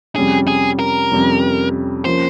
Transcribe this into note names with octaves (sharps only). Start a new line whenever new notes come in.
F2 C3 G3 C#4 G#4
G#4
A#4
F2 C3 G3 C#4
F3 A#3 C#4 C5